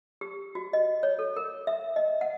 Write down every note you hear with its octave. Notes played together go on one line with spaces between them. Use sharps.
G4
F#4
D#5
C#5
A4
A#4
E5
D#5
F#5